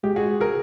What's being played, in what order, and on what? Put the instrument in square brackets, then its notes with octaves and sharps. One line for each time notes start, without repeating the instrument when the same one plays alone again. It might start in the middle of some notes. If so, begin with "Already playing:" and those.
[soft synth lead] G#3 [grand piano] G4
[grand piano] F#4 G#4
G#4 A#4